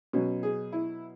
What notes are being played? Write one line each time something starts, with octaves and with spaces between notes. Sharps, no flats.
B2 F#3 C#4
G#4
E4